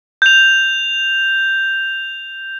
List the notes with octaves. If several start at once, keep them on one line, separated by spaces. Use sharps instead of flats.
G6 F7